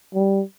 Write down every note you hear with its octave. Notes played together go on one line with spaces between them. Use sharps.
G3